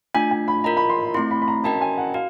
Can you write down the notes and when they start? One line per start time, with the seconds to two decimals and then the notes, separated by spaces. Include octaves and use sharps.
0.14 A3 D4 F4 G#5
0.31 G#5
0.48 B5
0.64 F4 A#4 D#5 A#5
0.77 B5
0.90 C6
1.14 A3 C4 E4 C6
1.31 B5
1.42 B5
1.48 A#5
1.64 C#4 F#4 A#4 D#5 G5 A5
1.81 G#5
1.98 F#5
2.14 F#4 F5